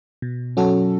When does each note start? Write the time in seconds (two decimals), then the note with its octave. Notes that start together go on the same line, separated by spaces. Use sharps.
0.22 B2
0.57 F#3 C#4 F#4 A4